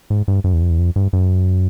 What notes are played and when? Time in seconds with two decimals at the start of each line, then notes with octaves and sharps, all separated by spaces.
0.10 G#2
0.28 G2
0.44 F#2
0.53 E2
0.62 F2
0.70 E2
0.79 F2
0.96 G2
1.13 F#2